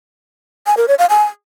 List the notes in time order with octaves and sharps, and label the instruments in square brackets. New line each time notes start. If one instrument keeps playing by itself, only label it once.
[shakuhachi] G#5
A#4
C#5
F5
G#5